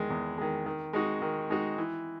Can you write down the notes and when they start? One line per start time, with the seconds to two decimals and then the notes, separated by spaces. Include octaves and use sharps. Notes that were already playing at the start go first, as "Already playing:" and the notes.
Already playing: E2 D#3 G#3
0.10 E2
0.38 D#3 G#3
0.66 D#3
0.93 G#3 D#4 F#4
1.22 D#3
1.50 G#3 D#4 F#4
1.78 E3